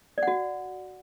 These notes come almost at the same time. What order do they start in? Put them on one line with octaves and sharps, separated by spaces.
D5 F#5 F#4